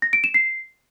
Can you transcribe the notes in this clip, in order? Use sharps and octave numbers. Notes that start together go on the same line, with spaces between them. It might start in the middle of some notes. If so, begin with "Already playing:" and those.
A#6
D7
E7
C7